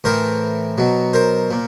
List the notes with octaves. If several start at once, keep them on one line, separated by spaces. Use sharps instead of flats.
A2 E3 A#4 C5
B2 F#3
A#4 C5
A#2